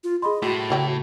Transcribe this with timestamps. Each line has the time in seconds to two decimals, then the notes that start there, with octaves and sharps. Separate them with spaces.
0.04 F4
0.22 G#4 D#5 B5 C6
0.42 A2 G3 F#4
0.70 C#3 E3 F#3 G5